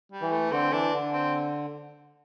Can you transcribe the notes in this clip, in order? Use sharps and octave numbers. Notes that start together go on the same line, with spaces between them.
G3
E3
A3
D3 C4
E3 D4
D3
C4